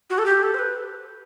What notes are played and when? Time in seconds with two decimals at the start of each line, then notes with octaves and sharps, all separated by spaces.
0.10 F#4
0.18 A4
0.26 G4
0.43 A4
0.54 C5
0.59 B4